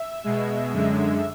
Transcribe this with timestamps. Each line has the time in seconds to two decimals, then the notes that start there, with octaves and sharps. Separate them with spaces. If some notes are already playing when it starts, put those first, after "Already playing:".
Already playing: E5
0.24 B2 G#3
0.72 F#2 D3 G#3